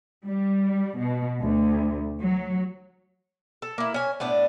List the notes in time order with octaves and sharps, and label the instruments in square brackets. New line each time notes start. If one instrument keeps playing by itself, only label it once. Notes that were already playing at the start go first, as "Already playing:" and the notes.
[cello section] G3
B2
D2
F#3
[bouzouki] A4
A#3 E4
C#4 G#5
A2 B3 D4